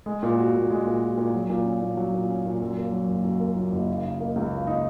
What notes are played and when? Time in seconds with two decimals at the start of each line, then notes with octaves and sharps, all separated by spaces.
0.06 G#3
0.23 A#2
0.38 F#4
0.55 A#2
0.70 G#3
0.86 A#2
1.02 F#4
1.17 A#2
1.34 F#3
1.50 A#2
1.65 C#4
1.82 A#2
1.97 F#3
2.14 A#2
2.29 C#4
2.46 A#2
2.61 F#2
2.77 A#3
2.92 F#3
3.08 F#1
3.25 F#2
3.40 A#3
3.56 F#3
3.72 F#1
3.89 C#3
4.04 D#4
4.20 A#3
4.36 C#2
4.52 C#3
4.67 D#4